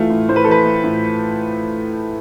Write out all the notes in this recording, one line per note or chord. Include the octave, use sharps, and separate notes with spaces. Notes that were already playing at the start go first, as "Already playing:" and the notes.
Already playing: A2 E3 A3 F4
A2
A2 C5
B4
A4
E3 B4
A3
A2